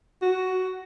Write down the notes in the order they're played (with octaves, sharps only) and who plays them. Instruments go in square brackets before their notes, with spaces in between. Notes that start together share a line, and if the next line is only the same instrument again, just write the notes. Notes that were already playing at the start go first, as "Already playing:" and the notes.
[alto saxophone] F#4